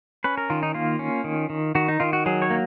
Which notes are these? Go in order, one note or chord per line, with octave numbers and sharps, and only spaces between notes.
C#4 B4
A#4
D#3 F4
D#4
A#3 F4
C#4
D#3
D#3
D#3 F#4
D#4
D#3 F4
F#4
F#3 G#4
C#5
A#3